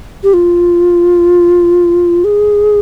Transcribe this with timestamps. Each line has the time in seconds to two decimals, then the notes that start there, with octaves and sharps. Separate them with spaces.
0.23 G4
0.33 F4
2.24 G#4